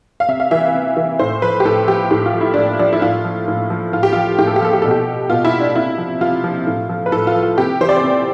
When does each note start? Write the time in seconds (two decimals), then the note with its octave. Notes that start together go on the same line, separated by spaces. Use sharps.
0.20 F5
0.28 C3 E5
0.40 F5
0.51 E3 E5
0.74 C3
0.97 E3
1.19 A2 C5
1.42 F3 B4
1.60 G4
1.65 A2 A4
1.88 F3 G4
2.11 A2 G4
2.26 F4
2.34 F3
2.41 E4
2.54 A2 D4
2.79 F3 D4
2.93 E4
3.02 A2 F4
3.25 F3
3.48 A2
3.70 F3
3.93 A2 F4
4.03 G4
4.13 F3 F4
4.38 A2 G4
4.47 A4
4.56 G4
4.61 F3 A4
4.73 G4
4.82 B2 A4
4.91 G4
5.30 B2 F4
5.45 E4
5.60 D4
5.75 C3 E4
5.98 F3
6.21 C3 F4
6.44 F3
6.67 A2
6.89 F3
7.06 B4
7.12 A2 A4
7.27 F4
7.35 F3
7.43 F4
7.58 C3 G4
7.81 E3 C5
7.89 D5
7.96 C5
8.03 C3